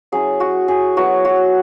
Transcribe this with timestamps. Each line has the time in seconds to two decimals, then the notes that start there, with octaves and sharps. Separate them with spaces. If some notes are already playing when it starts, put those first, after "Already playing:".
0.12 F#3 C#4 E4 G#4
0.40 F#4
0.68 G#4
0.96 F#3 B3 E4 F#4
1.25 F#4